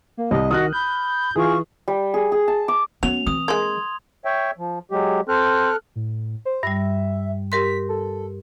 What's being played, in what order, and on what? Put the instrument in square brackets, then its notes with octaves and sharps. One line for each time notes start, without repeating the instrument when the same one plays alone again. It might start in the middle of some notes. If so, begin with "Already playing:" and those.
[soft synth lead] A#3
[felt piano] C2 [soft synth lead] D#5
[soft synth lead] D#3 [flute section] F#4 D#5 F#5 [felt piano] D#6 F6 F#6
[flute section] B5 [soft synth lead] G6
[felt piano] E3 [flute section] F4 C#6 [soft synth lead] G#4
[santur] G3
G#4
G#4
A5
D6
[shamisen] F#3 [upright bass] B3 C#4 [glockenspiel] F7
[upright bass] E3 C4 [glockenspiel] D#6
[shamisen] G#3 A#3 [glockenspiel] C6 G#6
[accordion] C#5 E5 G5
F3
F#3 G#3 G4
[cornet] C4 [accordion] A4 F6 F#6
[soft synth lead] A2
C5
[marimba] G2 G3 [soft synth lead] E5
[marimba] G4 A#4 C6 [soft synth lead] B6
[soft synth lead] A4